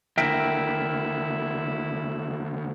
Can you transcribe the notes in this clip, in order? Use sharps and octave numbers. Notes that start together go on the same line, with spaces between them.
D#2 D3 E4 A#4 E5 G5